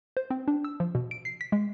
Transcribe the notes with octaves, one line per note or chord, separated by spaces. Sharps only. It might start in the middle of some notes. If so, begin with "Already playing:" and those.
C5
C4
D4
E6
F3
B2
D7
C7
B6
G#3